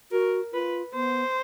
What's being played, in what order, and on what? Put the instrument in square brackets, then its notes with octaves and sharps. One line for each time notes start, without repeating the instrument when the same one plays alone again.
[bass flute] F#4 [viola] A#4
[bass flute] F4 [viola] B4
[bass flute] B3 [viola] C5